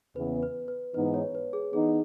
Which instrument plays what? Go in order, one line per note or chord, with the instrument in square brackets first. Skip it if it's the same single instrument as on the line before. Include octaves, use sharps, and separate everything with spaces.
[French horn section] E2 C#3 E3 B3 [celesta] B4
[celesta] B4
B4
[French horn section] G#2 E3 B3 D#4 [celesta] B4
[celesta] C#5
B4
G#4
[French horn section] E3 B3 D#4 [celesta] G#4